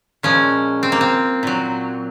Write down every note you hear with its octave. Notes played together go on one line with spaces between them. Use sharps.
A#2 F3 G#3 C#4
C4
A#3
C4
A#2 F#3